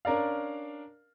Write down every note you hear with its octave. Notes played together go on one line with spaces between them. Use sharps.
C#4 D4 A#4 D5 F5